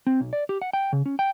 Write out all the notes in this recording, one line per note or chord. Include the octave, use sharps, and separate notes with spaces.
C4
B1
D5
G4
F#5
G5
C#3
C#4
G5